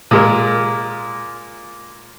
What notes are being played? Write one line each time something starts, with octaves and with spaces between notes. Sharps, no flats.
A#2 G#3 A#4